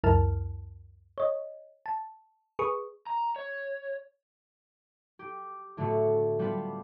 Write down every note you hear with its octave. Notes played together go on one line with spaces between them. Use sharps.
C#2 F#2 E4 A#4 A5 F6
C#5 D#5
A5
G#4 B4 C#6 D#6
A#5
C#5
G4
A2 D3 A3 B3 F#4
G3 B3 D4 F4 B4